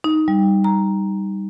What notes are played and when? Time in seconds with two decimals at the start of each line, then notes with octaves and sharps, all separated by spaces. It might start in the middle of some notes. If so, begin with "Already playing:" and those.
0.04 D#4
0.28 G3
0.64 A#5